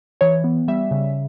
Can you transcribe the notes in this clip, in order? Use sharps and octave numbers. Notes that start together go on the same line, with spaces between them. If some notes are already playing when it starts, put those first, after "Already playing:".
E3 C#5
B3
G3 E5
C#3